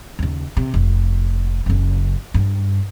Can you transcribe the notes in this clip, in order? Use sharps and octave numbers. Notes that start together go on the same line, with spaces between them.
D#2 C#3
C3
F1
F#1 C#3
G2